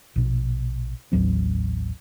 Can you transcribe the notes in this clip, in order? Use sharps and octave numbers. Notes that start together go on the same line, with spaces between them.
A#1 B2
A1 D#2 F#3 C4